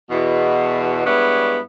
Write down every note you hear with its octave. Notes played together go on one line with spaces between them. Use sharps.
E2 B2
G2 G#3 B3 E4 C#5 D5